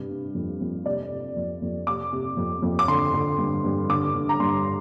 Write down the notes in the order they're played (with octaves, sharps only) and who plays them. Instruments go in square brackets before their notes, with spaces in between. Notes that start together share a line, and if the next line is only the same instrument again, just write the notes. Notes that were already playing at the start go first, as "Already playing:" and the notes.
Already playing: [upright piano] G2 C3
C3
F2
F2
C3 D5
C3
F2
F2
C3 D6
C3
F2
F2
D6
D3 C6
D3
G2
G2
D3 D6
D3
A#5
G2 C6